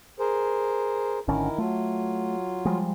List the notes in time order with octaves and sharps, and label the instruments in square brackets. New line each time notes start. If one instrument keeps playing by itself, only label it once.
[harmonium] G#4 A#4 C5
[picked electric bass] G#1 D3 C#4 [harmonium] D#3 E4 A#4
[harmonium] F#3 F4 [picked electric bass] A3
[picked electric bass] F3 G3 G#3